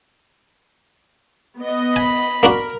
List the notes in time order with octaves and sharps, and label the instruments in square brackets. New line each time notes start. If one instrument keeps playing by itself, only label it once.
[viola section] B3 D#5
[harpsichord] G#5 [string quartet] B5
[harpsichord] A#3 D4 F#4 [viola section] A#4